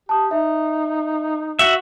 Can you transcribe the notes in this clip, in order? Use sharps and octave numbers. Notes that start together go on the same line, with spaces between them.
G4 A5 D#6
D#4 E5
F#4 E5